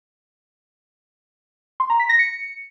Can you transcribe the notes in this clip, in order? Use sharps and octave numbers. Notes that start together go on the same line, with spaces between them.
C6
A#5
B6
A#6
C#7